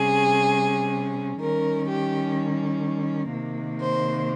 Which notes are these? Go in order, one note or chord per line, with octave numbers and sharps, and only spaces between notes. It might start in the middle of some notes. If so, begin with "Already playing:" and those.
Already playing: C3 G3 C#4 G#4
D#3 G3 C#4 A#4
G4
C3 D#3 A#3
C5